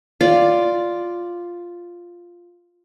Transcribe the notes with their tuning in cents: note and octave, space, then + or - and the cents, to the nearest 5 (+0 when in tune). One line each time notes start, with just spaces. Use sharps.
F4 +0 D5 +0